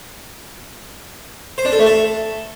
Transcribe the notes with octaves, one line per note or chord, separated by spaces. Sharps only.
C5
D4
A4
A3
A4